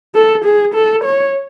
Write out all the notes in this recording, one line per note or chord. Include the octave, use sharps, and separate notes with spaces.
A4
G#4
A4
C#5